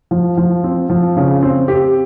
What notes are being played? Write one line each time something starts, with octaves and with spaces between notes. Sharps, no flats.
F3
F3
C4
F3
C#3
C4
G4